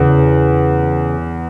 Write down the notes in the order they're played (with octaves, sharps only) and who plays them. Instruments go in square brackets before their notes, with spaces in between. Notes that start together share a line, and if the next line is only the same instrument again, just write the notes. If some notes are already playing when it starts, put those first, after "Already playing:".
Already playing: [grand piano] E2 [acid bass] C#3